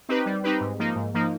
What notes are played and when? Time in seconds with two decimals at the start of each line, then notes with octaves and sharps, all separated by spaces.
0.09 C4 D#4 G4 B4
0.26 G3
0.44 C4 D#4 G4 B4
0.60 G#2
0.79 F3 A#3 D#4
0.95 G#2
1.14 F3 A#3 D#4